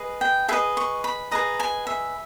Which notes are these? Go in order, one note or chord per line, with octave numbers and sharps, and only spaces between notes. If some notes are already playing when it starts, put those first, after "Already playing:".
Already playing: G#4 B4 D#5
G5
G#4 B4 D#5 E5
C#6
B5
G#4 B4 D#5 A#5
G#5
E5